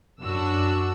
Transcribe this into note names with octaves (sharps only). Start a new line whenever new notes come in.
F#2 D4 F#4 E6